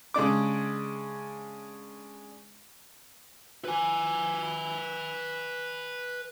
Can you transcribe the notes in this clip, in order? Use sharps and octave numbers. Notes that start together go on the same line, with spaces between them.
C#3 G#3 D4 D6
B4 G#5